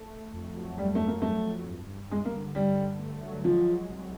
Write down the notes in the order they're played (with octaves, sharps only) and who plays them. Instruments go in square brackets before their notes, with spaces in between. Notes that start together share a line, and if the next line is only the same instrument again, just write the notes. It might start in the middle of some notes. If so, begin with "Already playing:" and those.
Already playing: [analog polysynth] A3
A3
F2
F#3
[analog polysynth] F2 [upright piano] G3
[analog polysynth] F2 [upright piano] A3
[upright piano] A#3
[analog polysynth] F#3 [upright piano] A3
[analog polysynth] F2
G2
G2
[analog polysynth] G2 [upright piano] G#3
[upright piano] A#3
[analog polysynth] D3
[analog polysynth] D3 [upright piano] G3
[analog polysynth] D3
A3
F#3
[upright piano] F3 [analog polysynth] G#3
[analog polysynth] G#3
C2